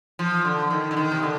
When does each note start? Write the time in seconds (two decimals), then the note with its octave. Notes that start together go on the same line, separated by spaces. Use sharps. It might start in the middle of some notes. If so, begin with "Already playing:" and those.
0.19 F3
0.45 D3
0.70 D#3
0.91 D3
0.97 D#3
1.12 C3
1.23 D3